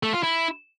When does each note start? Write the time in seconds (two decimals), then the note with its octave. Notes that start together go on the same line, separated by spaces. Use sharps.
0.03 A3
0.13 F4
0.23 E4